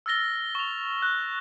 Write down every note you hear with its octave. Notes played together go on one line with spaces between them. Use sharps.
E6 F6 A6 A#6 G7
C#6 F7
F#6